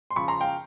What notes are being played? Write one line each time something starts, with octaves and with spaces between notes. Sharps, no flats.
C6
C#3 F3 B5 C#6
A#5 C6
F5 G5